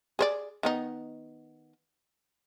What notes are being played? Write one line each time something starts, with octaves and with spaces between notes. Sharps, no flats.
G#4 C5 D5
D#3 B3 D#4